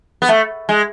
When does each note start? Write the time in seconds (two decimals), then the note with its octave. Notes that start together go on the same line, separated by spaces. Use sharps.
0.22 B3
0.29 A3
0.69 G#3